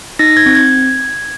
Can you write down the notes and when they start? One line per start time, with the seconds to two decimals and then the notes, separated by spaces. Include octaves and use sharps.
0.19 D#4 A#6
0.37 G#6
0.46 C4
0.55 G#6